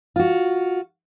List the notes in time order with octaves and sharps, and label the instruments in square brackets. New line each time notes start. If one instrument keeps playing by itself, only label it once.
[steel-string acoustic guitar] F4 F#4